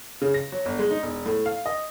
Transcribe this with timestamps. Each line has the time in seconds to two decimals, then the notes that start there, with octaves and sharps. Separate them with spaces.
0.22 C#3
0.34 A#6
0.52 F#3
0.66 G1
0.79 G#3
0.91 D#4
1.03 E1
1.26 A2
1.46 F5
1.66 D#5